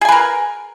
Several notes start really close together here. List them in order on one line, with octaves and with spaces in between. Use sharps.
G#4 G#5 B4 A#4